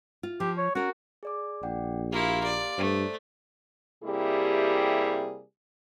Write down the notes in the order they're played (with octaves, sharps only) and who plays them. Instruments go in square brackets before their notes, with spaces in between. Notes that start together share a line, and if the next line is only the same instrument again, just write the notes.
[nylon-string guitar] F4
[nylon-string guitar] F3 [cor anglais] G4
[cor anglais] C#5
[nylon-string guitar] C#4 A#4 [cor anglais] F#4
[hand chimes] G#4 D5 D6
[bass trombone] A#1 [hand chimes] D5 F#5 G5
[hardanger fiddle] A#3 E4 [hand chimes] G4 F5 C6
[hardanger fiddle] D5
[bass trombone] G2 [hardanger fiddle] A3 [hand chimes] C5 D5
[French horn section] C3 G3 A#3 E4 G4 G#4